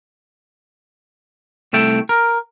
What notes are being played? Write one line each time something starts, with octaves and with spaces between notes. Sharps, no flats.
C2 A3 E5 G5
A#4